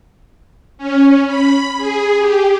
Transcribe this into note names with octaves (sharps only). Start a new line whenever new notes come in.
C#4
B5
G#4
G4